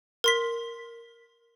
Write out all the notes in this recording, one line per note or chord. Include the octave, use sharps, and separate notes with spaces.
A#4 C6 B6